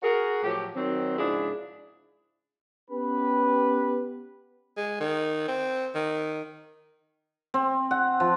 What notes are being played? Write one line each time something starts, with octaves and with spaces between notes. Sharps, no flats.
F#4 G#4 A#4
A2 F3 F#3 G4
D#3 F#3 C4
G#2 C#3 F3 D4 E4 G#4
B3 C#4 G4 B4
G#3
D#3
C4
D#3
C4
F#5
F3